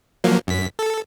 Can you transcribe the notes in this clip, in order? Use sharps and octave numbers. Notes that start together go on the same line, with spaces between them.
F3 F#3 A#3
F#2 B6
A4